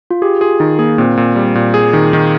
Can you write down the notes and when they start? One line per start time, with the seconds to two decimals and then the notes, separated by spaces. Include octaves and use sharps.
0.11 F4
0.22 G4 G#4
0.41 F4 G#4
0.60 D#3 D#4
0.79 A#3 G#4
0.98 A#2 C4
1.17 A#2
1.36 G3
1.55 A#2
1.74 G#4
1.93 D#3
2.13 D#3